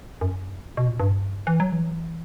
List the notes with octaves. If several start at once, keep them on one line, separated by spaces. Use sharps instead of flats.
F#2
B2
A#2
G2
E3
F#3
E3